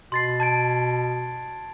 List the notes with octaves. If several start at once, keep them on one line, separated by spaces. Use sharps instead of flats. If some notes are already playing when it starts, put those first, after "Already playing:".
B2 C6 A6 C7
A5 G#6 D7